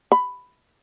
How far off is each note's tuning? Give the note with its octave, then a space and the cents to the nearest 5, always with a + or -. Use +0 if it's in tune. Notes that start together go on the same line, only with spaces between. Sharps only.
B5 +10